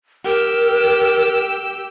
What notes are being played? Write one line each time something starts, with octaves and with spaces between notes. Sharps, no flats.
G4 A#4 E6